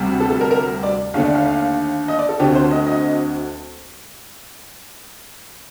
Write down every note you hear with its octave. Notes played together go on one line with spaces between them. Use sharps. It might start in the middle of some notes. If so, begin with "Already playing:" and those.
Already playing: D2 C3 G3
A4
A4
A#4
A#4
D5
D#2 D3 A3 F5
D5
F5
F5
D#5
D5
A4
D2 D3 A3 C4 G4
C5
D#5
D#5